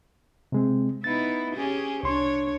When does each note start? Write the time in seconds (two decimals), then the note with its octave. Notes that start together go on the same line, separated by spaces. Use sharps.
0.52 C3 G#3 C4
1.04 B3 D#4 E4 A6
1.55 C#4 G4 G#4
2.03 C2 D4 C#5 C6